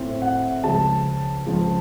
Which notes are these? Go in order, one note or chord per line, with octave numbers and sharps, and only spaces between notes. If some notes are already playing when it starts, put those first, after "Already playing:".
Already playing: A2 A3 C4
F#5
C#2 C#3 F3 A5
C#2 C#3 F3